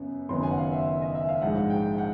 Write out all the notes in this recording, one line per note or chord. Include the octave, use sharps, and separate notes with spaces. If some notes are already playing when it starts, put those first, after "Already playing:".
Already playing: F#2 C#3 B3
F#1 F#2 D#3 F#3 B3 C6
G#5
F#5
F5
E5
D#5
E5
F5
A#1 G#2 F3 G#3 F#5
F5
G5
F#5